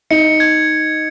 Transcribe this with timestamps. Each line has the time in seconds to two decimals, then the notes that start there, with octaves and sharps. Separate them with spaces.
0.11 D#4 C#7
0.40 G#6